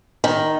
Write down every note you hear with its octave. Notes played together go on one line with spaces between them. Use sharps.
D#3